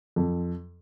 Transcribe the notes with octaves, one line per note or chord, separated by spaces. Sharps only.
F2